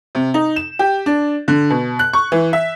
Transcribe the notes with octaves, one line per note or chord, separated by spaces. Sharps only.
C3
D#4
E7
G4
D4
D3
B2
F#6
C#6
E3
E5